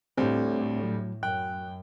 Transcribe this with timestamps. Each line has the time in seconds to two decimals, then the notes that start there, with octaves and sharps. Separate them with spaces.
0.18 D2 A2 G3 C4
0.83 F#3
1.23 F#2 G5 F#6